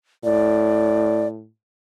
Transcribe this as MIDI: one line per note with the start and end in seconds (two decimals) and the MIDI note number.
0.24 1.49 45
0.24 1.28 74